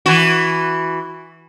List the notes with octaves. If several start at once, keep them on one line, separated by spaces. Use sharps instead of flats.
E3 F#4